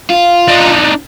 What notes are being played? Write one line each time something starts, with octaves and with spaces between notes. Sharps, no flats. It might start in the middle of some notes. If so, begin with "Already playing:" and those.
F4
D4 D#4